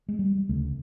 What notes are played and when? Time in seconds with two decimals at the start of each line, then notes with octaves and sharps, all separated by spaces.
0.08 G#3
0.19 G3
0.49 D2 C#3 A3